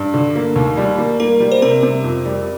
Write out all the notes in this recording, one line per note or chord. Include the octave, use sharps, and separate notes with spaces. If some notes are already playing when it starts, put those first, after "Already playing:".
Already playing: G2
D3
A#3
D#2
G3
A#3
A#3 A#4
G3
C5
C3 A#4
C3
F2
G3